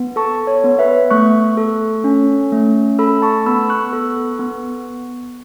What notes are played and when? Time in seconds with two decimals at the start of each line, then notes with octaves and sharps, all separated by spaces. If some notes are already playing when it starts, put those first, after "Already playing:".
Already playing: B3
0.16 A4 A5 C#6
0.47 C#5
0.64 B3
0.79 B4 E5
1.10 A3 C#6 F#6
1.57 A4
2.04 C#4
2.52 A3
2.99 A4 B5 E6
3.22 A5 C#6
3.46 B3 B5 E6
3.69 C#6 F#6
3.93 A4
4.39 B3